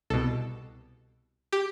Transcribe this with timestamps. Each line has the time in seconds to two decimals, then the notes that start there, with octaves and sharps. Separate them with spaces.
0.10 C2 B2 A4
1.53 G4